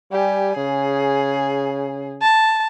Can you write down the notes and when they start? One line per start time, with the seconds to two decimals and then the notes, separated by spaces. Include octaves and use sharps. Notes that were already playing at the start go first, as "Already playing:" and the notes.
0.12 G3 G4 G#5
0.56 C#3 G#4
2.22 A5